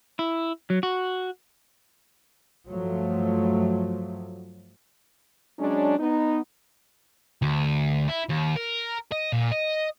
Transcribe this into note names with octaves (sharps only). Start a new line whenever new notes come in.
E4
F#3
F#4
G2 F3 F#3 A3
F#3 G#3 C#4 D4
B3 D#4
D2
E4
D#2
A#4
D#5
A#2
D#5